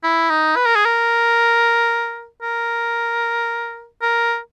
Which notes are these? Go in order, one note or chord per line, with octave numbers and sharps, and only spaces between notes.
E4
D#4
B4
A#4
G#4
A#4
A#4
A#4